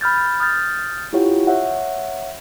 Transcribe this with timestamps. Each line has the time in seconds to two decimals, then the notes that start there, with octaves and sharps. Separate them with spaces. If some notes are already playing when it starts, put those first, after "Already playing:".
0.01 B5 F6 G6 A6
0.40 D#6 F6 G6 A6
1.13 E4 F4 G4 C#5 F#5
1.47 C#5 E5 F#5